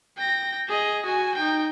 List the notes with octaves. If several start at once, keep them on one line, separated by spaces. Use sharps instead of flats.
G5 A#6
G#4 D#5
F#4 G#5
D#4 G5